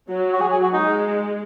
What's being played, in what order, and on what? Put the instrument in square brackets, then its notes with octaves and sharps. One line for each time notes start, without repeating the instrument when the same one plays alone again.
[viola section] F#3
[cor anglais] F#4
[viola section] F#3 [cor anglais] G#4
[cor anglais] G#4
F#4
[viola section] G#3 [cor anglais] D#4